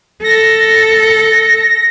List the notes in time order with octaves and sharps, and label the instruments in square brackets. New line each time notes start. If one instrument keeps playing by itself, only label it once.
[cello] A4 [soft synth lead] A#6